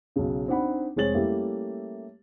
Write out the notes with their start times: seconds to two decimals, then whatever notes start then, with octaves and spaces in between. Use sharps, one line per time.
0.16 B1 C#3
0.48 C4 D4 D#4 F#5 B5
0.96 F1 G#3 C4 C#5 A6 F#7
1.15 G3 A3 A#3 C#4 E4 G4